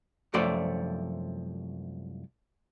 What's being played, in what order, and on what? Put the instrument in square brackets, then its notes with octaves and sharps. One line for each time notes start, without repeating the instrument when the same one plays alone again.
[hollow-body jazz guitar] C2 F#2 F3 A3 D5 C6